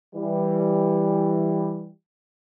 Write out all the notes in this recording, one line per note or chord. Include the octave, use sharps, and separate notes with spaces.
E3 G3